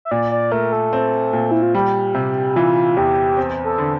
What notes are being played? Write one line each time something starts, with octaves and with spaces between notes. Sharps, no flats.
E5
A#2 D5
D5
A3 A#4
A4
C4
A#2
E4
F4
G3 G4
C3
E3 F4
E2 G4
C4
A4
D3